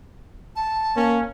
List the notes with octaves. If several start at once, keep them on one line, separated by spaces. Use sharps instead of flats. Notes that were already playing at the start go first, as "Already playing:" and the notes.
A5
A#3 C#4